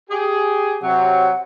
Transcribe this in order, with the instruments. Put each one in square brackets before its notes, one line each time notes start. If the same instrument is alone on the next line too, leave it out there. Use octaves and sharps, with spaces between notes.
[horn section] G4 G#4
[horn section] C3 F#3 [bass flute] F#5